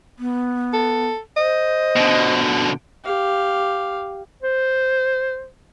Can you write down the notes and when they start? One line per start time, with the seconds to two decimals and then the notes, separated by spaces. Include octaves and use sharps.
0.19 B3
0.73 A4
1.37 C5 D#5
1.96 B2 D3
3.04 G4 F5
4.43 C5